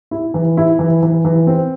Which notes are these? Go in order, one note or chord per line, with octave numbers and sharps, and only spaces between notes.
E4
E3
E4
E3
E3
E3
C4